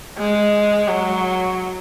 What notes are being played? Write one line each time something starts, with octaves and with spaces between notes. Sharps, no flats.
G#3
F#3